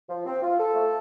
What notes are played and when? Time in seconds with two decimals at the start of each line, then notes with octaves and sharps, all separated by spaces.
0.09 F3
0.26 C4
0.42 F4
0.59 A4
0.75 A3